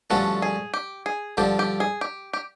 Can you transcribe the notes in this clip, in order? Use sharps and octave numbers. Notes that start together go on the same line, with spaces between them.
G2 D3 F3 A3 C#4 F#4
G#4
G4
G#4
G2 D3 F3 G4
G4
G#4
G4
G4